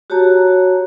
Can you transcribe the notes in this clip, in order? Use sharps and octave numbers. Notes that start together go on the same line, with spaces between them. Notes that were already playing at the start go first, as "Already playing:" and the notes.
F#4 G4 C#5 A5 A#5